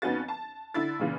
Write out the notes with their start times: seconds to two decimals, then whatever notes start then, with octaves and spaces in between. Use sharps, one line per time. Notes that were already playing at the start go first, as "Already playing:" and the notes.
0.02 F2 B3 C#4 D#4 F#4 A6
0.28 A5
0.74 D3 E4 A6
0.99 A#2 C#3 E3